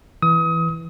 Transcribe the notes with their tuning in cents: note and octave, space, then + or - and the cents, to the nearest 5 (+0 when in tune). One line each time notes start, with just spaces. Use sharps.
E3 +0 D#6 +30